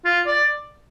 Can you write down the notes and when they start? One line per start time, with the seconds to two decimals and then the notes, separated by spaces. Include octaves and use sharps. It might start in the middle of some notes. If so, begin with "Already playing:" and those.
0.05 F4
0.27 D5